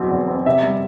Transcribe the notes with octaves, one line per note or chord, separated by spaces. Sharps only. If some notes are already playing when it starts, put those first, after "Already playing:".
Already playing: E2 B2 F#3 C4
E2
C4
C3 E5
G3